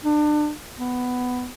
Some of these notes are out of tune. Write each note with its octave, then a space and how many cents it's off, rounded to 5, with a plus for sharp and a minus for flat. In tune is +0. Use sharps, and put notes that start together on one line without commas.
D4 +30
B3 +10